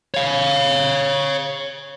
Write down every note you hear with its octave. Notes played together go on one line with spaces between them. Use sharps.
C#5 F5